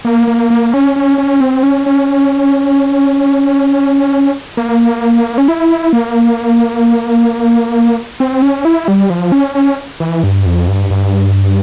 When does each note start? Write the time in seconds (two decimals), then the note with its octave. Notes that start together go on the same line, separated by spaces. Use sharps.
0.05 A#3
0.27 A#3
0.50 A#3
0.74 C#4
0.96 C#4
1.18 C#4
1.40 C4
1.63 C#4
1.86 C#4
4.57 A#3
5.38 C#4
5.48 E4
5.93 A#3
8.20 C4
8.42 C#4
8.65 E4
8.88 G3
9.10 F3
9.32 C#4
9.55 C#4
10.00 E3
10.24 G2
10.46 F2
10.68 G2
10.90 G2